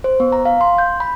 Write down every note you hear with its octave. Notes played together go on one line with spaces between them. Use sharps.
C5
B3
A#5
F5
C6
G6
B5